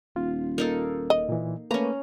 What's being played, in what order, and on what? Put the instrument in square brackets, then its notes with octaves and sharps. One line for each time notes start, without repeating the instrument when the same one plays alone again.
[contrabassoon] D#1 [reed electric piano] F4
[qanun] A#3 D#4 A4
[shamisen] D#5
[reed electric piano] A#2 E3
[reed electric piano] A3 A#3 B4 [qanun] C#4 A#5